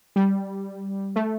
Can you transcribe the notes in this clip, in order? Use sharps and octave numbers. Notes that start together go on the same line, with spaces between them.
G3
A3